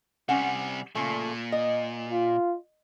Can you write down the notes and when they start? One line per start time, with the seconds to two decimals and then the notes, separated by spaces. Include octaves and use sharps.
0.29 C3 G3 C#4 F#5
0.95 A#2 C#3 F3 A3
1.52 D#5
2.10 F4